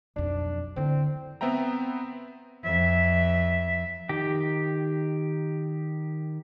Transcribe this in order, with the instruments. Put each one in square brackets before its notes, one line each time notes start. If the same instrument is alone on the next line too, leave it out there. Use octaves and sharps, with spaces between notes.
[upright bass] B1 F2 [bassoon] D4
[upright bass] D3 E4 [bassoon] C4
[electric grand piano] B3 C4 E5 G5 A#5
[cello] F2 E5
[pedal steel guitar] D#3 G4